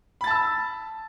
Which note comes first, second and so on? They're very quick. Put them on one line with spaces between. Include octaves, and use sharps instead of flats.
B5 A6 A5 E6